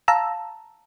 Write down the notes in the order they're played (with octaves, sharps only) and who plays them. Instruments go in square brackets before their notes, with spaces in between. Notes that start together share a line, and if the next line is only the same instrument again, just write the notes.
[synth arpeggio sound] F5 A5 A#5 E6